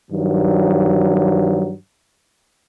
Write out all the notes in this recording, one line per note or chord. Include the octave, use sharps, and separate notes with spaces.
G2 D#3 F3 F#3